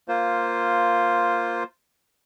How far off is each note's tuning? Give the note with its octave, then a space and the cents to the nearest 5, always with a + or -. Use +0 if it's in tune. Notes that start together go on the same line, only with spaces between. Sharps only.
A#3 +0 F4 +0 C5 +0